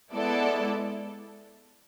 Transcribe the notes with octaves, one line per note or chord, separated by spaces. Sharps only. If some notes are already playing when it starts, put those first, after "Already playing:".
G#3 B3 E4 A4 D5